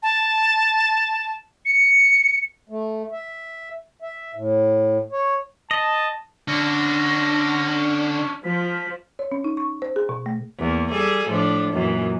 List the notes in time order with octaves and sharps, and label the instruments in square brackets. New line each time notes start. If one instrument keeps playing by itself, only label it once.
[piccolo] A5
C#7
[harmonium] A3
E5
E5
A2
C#5
[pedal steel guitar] D#5 [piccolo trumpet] A5
[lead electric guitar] D3 [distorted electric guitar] C#4 D4 [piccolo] A#6
[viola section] F3 [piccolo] B6
[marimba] C#5
C#4
D#4
C#6
C5
G#4
B2
A3
[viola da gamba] E2 A#3
G3 G#4 A4
A2 F3 D4
F#2 A#2 E3